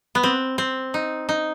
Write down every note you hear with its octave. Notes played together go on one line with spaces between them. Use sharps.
B3
C4
C4
D#4
D#4